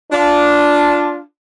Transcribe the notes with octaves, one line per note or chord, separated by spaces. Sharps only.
D4 F4